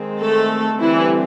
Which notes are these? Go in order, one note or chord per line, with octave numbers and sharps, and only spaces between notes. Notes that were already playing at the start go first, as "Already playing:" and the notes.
Already playing: D#3 G#3 C4
A3 A4
D3 E3 G3 C4 E4